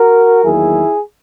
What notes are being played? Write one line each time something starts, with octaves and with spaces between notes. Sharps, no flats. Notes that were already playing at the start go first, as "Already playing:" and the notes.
Already playing: F#4 A#4
E2 D#3 F#3 A#3 E4 G#4